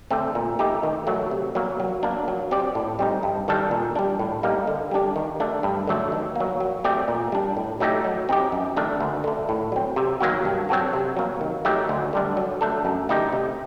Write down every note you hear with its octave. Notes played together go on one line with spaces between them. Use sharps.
D3 A3 C4
A#2
A3 D#4 G4
D#3
F#3 A3
C3
F#3 A#3
F#3
A#3 D4
F#3
C4 G4 D5
A2
G3 C4 D#4
G2
D#3 G3 D4 A4
A#2
G3 D4
A2
G3 A#3 D#4
D3
G3 D4 G4
D#3
A3 D4
G2
D3 F#3 A3
D#3
F#3 A#3
F#3
A3 C4 G4 D5
A#2
G3 D4
A2
F#3 A3 D#4 G4
F#3
C4 D#4 G4
F#2
D#3 A3 D4
D2
D3 A3
A2
F#3 C4
C3
D#3 F#3 A#3 F#4
G2
F#3 C4 F#4 A4
C3
F#3 A#3
D#3
F#3 A3 D#4 G4
D2
D3 G3 D4
F#3
A3 D4 A4
F#2
D3 A3 D#4 G4
C3